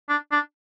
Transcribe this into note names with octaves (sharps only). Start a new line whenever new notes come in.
D4
D4